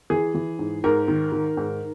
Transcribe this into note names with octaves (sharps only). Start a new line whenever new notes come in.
E3 G#4
E3
G#2
G#2 A#4
D#3
D#3
G#2